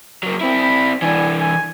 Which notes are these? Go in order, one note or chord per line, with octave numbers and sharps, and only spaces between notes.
F#3 A#3
C4 E4 B5
B5
E3 D4 G#5
G#5